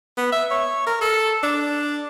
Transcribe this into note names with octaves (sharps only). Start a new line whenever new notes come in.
B3
E5
C#5
A#4
A4
D4